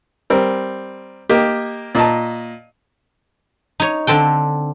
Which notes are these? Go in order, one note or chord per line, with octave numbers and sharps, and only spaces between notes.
G3 C4 A#4
A#3 G4 D#5
A#2 D#5 A5
D#4 C#5
D3 C4 A4 G5